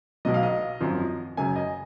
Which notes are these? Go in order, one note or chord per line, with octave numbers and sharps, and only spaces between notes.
B1 B2 F#3 D#5
F5
D#5
G#1 F#2 F3
F#1 F#2 C#3 G#5
D#5